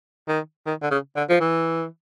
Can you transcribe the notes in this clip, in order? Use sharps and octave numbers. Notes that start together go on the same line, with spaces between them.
D#3
D#3
D3
C#3
D3
F3
E3